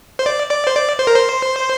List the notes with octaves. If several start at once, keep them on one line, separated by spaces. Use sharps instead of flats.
C5
D5
D5
C5
D5
C5
A#4
C5